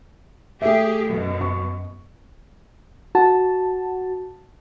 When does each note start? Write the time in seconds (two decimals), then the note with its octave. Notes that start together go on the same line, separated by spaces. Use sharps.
0.62 A3 G4 G#4 E5
1.06 F#2 B2
1.41 C#6
3.15 F#4 A5